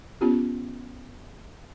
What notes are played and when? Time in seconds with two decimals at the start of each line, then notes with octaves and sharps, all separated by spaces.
0.21 B3 C#4 F4 G4